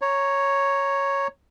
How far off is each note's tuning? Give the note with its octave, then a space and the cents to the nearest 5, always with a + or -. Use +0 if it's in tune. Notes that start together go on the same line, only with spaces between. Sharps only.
C#5 +0 A#5 +0